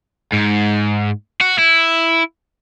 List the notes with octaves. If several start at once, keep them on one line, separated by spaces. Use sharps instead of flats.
G#2
F#4
E4